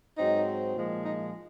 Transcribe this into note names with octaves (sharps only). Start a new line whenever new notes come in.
G#2 F#3 C4 D#4
A#2 F3 G#3
D#4